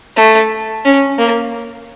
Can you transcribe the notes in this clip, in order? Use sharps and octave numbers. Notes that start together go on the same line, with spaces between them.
A3
C#4
A#3